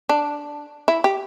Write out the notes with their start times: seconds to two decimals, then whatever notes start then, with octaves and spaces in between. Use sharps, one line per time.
0.09 D4
0.88 E4
1.04 G4